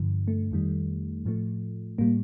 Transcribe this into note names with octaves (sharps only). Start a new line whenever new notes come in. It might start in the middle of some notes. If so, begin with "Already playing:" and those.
Already playing: G2 D3 F3
A3
F2 D#3 G3
A2 F3 A3
A2 G3 A#3